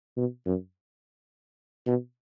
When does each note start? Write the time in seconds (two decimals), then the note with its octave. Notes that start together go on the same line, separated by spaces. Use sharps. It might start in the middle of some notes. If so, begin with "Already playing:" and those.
0.17 B2
0.46 F#2
1.87 B2